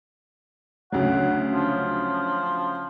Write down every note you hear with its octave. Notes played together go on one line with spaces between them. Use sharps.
D2 C#3 F#3 F#5
F3